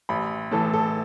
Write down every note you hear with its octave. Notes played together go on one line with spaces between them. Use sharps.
A1 B5
A2 E3 A4
A4